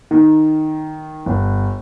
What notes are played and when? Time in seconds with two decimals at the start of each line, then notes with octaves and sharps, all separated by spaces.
0.11 D#3
1.26 G1